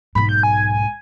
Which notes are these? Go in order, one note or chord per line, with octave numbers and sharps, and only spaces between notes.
B1 G#2 B5
G6
G#5